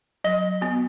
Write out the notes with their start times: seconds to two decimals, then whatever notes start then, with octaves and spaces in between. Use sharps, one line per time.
0.24 F#3 D#5
0.61 B3 F#4